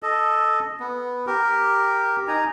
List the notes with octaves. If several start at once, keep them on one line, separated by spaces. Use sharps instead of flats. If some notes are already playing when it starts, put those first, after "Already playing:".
A4 D#5
B3
G4 A#4
D#4 G#5 A#5